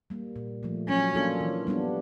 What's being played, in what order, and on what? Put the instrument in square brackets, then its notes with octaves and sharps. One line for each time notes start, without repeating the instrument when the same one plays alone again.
[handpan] G3 A#3
A#2
F3 A3
[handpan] F#3 [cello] C#4
[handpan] A#3 D4 F4 A4
E3
G3 B3 D4